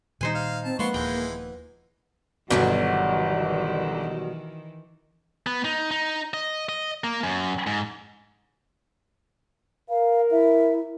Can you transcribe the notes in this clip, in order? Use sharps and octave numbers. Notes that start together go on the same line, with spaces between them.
A#2 D#3 G3 D#4 C5 G#5
F5
C4 A5
D#3 F3 G#3 A#3 B3 C6 C#6
D#1 E3 G#3 G5
G1 B2 D#3 E3 F#3 G3 F#4
B3
D#4
D#4
D#5
D#5
A#3
F#2
G#2
A#4 F5
E4 E5